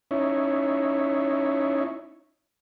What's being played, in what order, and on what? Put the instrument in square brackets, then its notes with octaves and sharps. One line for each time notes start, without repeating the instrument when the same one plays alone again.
[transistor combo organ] C#4 D#4 E4 C#5